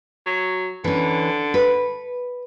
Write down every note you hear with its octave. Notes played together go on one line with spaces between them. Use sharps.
F#3
D3 E3 C#4
B4